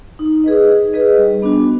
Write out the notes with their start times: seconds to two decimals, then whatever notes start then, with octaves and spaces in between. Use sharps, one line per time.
0.19 D#4
0.44 G#4 B4 D#5
0.68 D#4
0.93 G#4 B4 D#5
1.17 G3
1.42 B3 D4 F#4